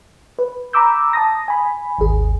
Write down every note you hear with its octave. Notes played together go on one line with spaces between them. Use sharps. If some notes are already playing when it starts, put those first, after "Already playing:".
B4
A#5 B5 D6 E6 G6
A5 D#6 A#6
G#5 B5
G#1 D#2 G#4